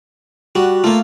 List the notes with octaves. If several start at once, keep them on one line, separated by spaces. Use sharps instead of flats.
G3 F#4
A3 A#3 F4